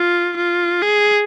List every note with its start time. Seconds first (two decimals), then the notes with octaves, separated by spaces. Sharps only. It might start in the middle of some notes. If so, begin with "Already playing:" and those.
Already playing: F4
0.37 F4
0.82 G#4